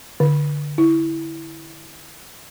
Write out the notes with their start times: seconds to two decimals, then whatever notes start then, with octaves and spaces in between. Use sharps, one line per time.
0.20 D3
0.78 E4